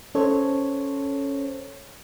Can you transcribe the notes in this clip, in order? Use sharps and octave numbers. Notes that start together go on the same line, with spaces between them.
C#4 A4 C5 C#5